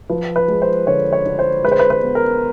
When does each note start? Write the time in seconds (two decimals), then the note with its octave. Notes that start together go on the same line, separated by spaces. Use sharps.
0.09 F3 B4
0.36 B4
0.48 G#3
0.62 C5
0.87 D3 C#5
1.13 C#5
1.26 D3
1.39 C5
1.64 G#3 B4
1.72 C5
1.79 B4
1.90 B4
2.03 B3
2.15 A#4